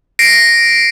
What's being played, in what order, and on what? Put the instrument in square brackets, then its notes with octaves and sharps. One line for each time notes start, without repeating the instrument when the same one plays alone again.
[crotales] A#6 C7 D7